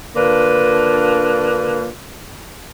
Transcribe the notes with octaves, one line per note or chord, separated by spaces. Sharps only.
D3 A#3 D4 F4 B4